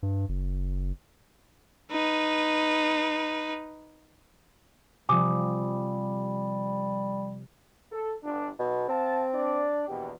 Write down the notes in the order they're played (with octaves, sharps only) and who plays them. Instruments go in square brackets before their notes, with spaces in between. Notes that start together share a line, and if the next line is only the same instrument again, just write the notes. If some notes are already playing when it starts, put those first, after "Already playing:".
[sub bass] G2
F#1
[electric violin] D#4 B4
[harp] C3 F3 [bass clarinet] G3 [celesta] G#5 D6 D#6
[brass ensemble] A4
G1 D4
[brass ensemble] B1 [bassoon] B2
[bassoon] C4 [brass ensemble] F5 A5
[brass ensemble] D4 D5
[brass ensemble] A#1 E2 B2 [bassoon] G4